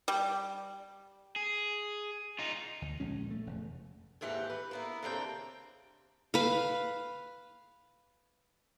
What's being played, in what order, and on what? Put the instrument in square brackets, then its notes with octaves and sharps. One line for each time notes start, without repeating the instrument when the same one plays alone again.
[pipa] G3
[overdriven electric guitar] G#4
D#4 F4
[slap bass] D2
A#1 F3 G#3 C#4
A3
F1 E2
[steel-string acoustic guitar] D#2 G#2 E3 G4 F#5
B4
A#3 B3 E4
D#2 C#3 A#3 C4 D4 G5
[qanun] B4 F5